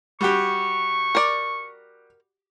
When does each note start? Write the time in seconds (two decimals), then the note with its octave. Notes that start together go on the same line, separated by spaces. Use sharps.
0.21 G3 F#4 G4 C#6
1.15 A#4 D5